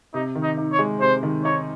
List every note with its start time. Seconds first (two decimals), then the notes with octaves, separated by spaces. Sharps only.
0.14 C3 D#4
0.35 D#3
0.43 D#4
0.58 D#4
0.72 C#5
0.79 G#3
1.00 C3 C5
1.23 D#3
1.44 D#4 C#5